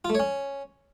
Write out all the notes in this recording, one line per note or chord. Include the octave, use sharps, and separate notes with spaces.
F4
A3
C#5
C#4